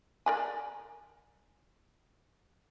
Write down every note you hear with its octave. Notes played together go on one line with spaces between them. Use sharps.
A#4 D5 G#5